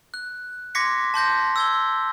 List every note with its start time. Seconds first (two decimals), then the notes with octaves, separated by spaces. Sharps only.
0.14 F#6
0.75 C6 D6 G#6 A#6 B6 C#7
1.14 A5 C6 G6 A#6
1.56 E6 G#6 G7